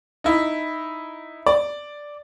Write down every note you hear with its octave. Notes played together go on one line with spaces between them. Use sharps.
D#4 E4
D5